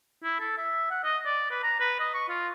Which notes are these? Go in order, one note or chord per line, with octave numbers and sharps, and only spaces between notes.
E4
A4
E5
F#5
D#5
D5
B4
A#5
B4
D#5
C#6
F4